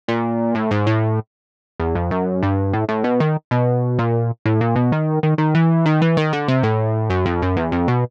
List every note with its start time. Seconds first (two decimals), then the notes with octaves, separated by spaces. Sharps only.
0.08 A#2
0.55 A2
0.71 G#2
0.87 A2
1.80 E2
1.95 F2
2.11 F#2
2.43 G2
2.73 A2
2.89 A2
3.04 B2
3.20 D#3
3.51 B2
3.99 A#2
4.46 A2
4.61 A#2
4.76 B2
4.92 D#3
5.23 D#3
5.38 D#3
5.54 E3
5.86 D#3
6.02 E3
6.17 D#3
6.33 D3
6.48 C3
6.63 A2
7.10 F#2
7.26 F2
7.42 F#2
7.57 E2
7.72 F2
7.88 B2